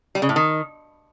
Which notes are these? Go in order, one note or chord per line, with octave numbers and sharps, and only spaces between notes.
G3
C#3
A2
D#3